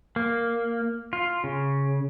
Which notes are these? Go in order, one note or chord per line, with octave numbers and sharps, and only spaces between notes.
A#3
F4
C#3